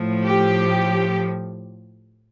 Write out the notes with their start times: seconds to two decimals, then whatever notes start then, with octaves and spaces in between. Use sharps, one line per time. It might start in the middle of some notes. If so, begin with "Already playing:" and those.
Already playing: A2 F3
0.22 G4